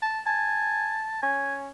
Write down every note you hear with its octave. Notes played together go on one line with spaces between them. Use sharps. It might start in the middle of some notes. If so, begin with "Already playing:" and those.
A5
G#5 A5
C#4 G#5